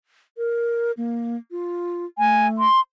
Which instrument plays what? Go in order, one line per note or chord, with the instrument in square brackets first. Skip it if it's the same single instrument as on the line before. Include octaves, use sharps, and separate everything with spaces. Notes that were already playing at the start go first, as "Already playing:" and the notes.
[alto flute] A#4
A#3
F4
[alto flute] A3 [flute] G#5
[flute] C6